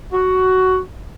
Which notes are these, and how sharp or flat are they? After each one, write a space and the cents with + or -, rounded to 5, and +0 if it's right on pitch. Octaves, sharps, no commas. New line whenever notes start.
F#4 +10